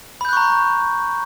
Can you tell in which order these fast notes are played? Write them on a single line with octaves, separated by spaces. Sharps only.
B5 G6 F#6 C#6 A#5